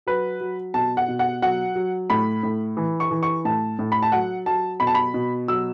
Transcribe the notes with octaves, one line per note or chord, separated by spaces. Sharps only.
F#3 B4
F#3
B2 A5
F#5
B2
F#5
F#3 F#5
F#3
A2 B5
A2
E3
C#6
E3
C#6
A2 A5
A2
B5
A5
F#3 F#5
F#3 A5
B2 B5
A5
B5
B2
F#3 E6